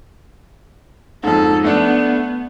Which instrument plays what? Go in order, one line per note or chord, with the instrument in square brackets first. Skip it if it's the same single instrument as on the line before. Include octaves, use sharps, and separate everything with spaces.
[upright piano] F2 G#2 [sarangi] A4
[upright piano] A3 D4 [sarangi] B3